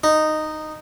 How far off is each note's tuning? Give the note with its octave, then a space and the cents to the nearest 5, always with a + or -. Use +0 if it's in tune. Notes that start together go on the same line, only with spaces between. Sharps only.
D#4 -10